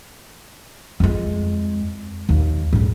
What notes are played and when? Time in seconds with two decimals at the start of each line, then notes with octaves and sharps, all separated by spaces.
1.00 F2 G#3
2.29 D#2
2.73 G#2 D3